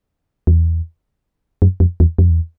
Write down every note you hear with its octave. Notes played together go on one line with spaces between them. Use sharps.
E2
F#2
F2
E2
F2
E2